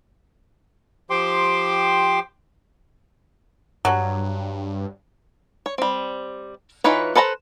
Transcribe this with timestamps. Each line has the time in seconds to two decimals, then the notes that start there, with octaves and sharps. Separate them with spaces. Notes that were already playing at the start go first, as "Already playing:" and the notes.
1.10 F3 G4 C5 G5 C6 D6
3.85 G2 F#3
5.66 C#5
5.78 G3 C4
6.84 E3 D#4 F4 B4 C#5
7.15 A4 B4 C5 A5 A#5